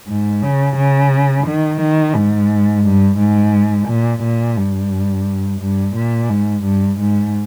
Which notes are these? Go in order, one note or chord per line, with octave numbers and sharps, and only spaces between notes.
G#2
C#3
C#3
D#3
D#3
G#2
G2
G#2
A#2
A#2
G2
G2
A#2
G#2
G2
G#2